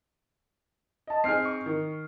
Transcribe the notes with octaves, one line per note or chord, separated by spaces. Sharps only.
D#5 A5
C4 D#4 G#4 F6 C7
C#6
D#3